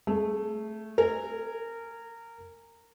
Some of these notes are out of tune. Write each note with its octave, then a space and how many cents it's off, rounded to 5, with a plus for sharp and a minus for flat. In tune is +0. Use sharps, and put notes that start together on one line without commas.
A3 +0 G#4 +25
A#4 -20 G#5 +0